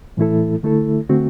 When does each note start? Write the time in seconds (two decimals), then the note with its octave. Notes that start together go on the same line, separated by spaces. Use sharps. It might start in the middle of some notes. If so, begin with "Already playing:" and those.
0.17 A2 E3 A3 E4 A4
0.63 D3 A3 E4 A4
1.09 D3 A3 C4 F#4